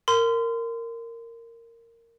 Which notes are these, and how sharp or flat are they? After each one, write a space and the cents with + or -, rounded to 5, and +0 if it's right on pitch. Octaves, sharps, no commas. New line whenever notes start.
A#4 -15 C6 -30